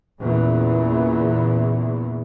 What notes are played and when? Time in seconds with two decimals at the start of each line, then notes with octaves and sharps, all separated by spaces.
0.22 E2 A#2 C#3 E3